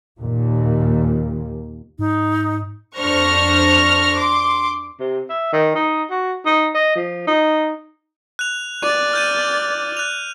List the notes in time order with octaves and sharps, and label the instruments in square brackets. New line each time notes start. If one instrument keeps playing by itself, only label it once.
[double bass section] D#2 A#2
[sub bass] G#2 [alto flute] D#4
[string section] F2 D4 C5 C#6 F6 A#6
C6 D6
[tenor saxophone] C3
E5
D#3
D#4
F#4
D#4
D#5
F3
D#4
[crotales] F#6 F7
[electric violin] D5 A6 [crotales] D#7
[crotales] F6 G6 D#7
F#6 F7